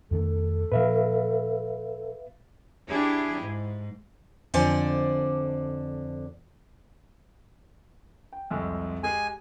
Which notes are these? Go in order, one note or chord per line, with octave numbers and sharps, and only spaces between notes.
F2 D#3 A3 A4
A#2 F3 B4 E5 F5
D4 E4 G4 G#4
G#2
F2 D3 C5 D5 G#5
G5
C2 F2 G#3
G#3 G4 G#4 G#5